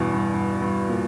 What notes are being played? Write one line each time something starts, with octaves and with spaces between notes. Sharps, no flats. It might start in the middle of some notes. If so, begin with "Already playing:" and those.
Already playing: E2 G2 B2
G2
G2
G2
A#2